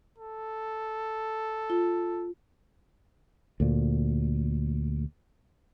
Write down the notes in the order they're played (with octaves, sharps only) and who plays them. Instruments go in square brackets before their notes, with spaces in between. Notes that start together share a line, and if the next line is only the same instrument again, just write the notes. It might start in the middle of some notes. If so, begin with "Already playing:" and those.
[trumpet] A4
[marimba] F4
[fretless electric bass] D2 A#2